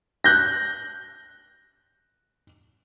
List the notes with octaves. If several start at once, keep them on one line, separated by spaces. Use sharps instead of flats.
F#6 G6 A#6